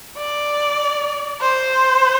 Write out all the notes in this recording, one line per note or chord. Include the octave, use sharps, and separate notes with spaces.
D5
C5